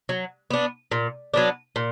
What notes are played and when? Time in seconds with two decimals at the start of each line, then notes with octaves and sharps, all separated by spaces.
0.09 F#3
0.50 B3 D4
0.92 A#2
1.34 F#3 B3 D4
1.76 A#2